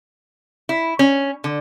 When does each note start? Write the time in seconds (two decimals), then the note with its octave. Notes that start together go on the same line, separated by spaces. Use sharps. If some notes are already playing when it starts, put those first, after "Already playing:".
0.69 E4
0.99 C#4
1.44 D3